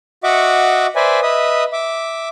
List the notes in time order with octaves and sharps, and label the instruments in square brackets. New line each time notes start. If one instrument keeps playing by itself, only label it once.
[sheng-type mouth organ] F#4 D#5 E5 F#5 C#6 D6
B4 C5 D5 E5 G#5
B4 D#5 E5 D#6
E5 D6